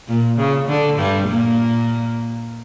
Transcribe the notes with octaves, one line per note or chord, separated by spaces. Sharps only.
A#2
C#3
D3
G2 G3
A#2 A#3